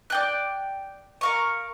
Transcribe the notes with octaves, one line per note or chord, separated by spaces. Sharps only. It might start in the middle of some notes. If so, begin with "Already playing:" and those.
D5 G5 F#6
A#4 F5 C#6